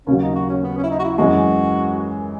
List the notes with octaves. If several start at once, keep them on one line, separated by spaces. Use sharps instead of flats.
D#2 C#3 F#3 C#4
D#4
F#4
C#4
B3
C#4
E4
D#4
F#4
E4
F#2 E3 G#3 F#4